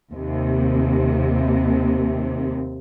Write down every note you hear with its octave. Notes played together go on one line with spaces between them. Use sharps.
D#2 C3